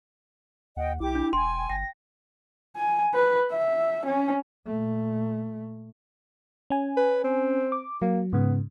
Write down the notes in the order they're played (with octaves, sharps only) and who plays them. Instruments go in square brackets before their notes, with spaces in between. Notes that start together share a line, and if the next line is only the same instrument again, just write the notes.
[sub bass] D#2 [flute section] D#5 G5 [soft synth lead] F#5
[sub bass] B1 [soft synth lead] E4 [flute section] G4 D6
[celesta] D4
[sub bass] E1 [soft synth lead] G5 [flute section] G#5 [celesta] C6
[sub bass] G1 [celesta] G5 [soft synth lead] A#6
[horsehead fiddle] G#5
B4
E5
C#4
[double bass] A#2 A3
[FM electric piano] C#4 G#5
[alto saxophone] B4
C4
[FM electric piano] D6
[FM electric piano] F#3 [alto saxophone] A#3
[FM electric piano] G#2 C#3 [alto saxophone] B3